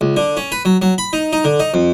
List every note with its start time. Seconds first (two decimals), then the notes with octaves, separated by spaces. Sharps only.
0.01 C#2
0.17 D3
0.37 C#4
0.52 B4
0.65 F#3
0.82 F#3
0.98 B5
1.13 D#4
1.33 D#4
1.44 D3
1.60 D#4
1.74 F2